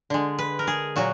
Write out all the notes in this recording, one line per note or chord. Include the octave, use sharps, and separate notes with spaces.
D3 G#3
B4
A#4
G#4
A#2 F#3 F#4